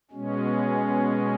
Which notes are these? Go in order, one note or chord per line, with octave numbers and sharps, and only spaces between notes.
B2 G#3 C#4